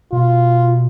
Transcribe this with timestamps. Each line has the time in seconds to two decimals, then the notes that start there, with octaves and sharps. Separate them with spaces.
0.13 B2 F4